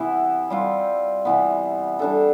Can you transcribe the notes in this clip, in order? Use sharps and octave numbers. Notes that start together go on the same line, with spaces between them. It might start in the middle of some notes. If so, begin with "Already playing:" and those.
Already playing: C3 E3 B3 E4
G3 C4 F4
C3 E3 B3
G3 D4 A4